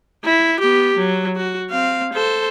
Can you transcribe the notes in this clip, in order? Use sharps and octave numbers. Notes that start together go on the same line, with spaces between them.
E4
B3 G4
F#3
F#4
C4 F5
A4 C5